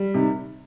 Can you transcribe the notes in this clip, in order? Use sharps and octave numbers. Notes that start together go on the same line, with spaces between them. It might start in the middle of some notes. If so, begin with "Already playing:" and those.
Already playing: G3
C3 D#3